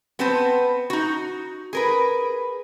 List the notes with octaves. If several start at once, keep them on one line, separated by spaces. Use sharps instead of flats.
B3 C4 B4 C5 A5
D#4 F#4
G#4 A#4 B4